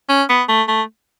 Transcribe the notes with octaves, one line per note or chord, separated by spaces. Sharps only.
C#4
B3
A3
A3